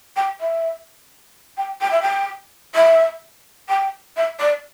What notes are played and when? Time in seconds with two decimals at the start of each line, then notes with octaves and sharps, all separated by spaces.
0.16 G5
0.40 E5
1.57 G5
1.81 G5
1.91 E5
2.02 G5
2.75 E5
3.69 G5
4.17 E5
4.39 D5